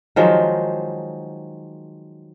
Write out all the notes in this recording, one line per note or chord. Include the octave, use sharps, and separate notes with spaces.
D#3 F3 F#3 G#3